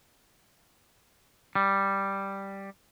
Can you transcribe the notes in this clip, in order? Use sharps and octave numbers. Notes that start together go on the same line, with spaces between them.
G3